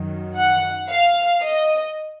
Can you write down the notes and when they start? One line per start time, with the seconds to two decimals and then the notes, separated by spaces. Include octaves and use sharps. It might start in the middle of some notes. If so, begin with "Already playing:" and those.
Already playing: F#2 D#3 F#3
0.36 F#5
0.90 F5
1.43 D#5